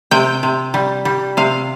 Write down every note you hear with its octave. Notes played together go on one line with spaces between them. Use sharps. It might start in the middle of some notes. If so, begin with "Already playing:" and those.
C3 G5
C3
G3
G3
C3 F5